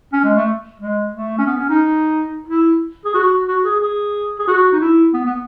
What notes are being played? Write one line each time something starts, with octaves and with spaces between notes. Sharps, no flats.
C#4
G#3
A3
G#3
A3
C#4
B3
C#4
D#4
E4
G#4
F#4
F#4
G#4
G#4
G#4
F#4
D#4
E4
B3
B3